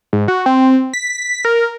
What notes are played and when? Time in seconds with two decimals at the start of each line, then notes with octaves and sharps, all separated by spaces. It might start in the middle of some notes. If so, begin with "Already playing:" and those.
0.13 G#2
0.28 F#4
0.46 C4
0.93 B6
1.45 A#4